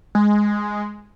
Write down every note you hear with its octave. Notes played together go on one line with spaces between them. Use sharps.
G#3